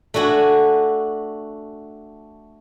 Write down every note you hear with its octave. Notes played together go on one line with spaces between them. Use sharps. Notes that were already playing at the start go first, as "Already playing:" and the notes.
A3 D4 F#4 G#5